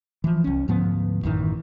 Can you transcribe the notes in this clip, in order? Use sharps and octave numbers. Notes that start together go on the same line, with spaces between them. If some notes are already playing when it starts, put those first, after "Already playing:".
E3 F3
C2 C#4
D2 G#2 F3 B3
A1 F#2 D#3 E3